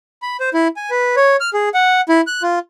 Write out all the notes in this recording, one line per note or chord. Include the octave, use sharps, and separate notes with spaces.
B5
C5
E4
G#5
B4
C#5
F6
G#4
F#5
E4
F#6
F4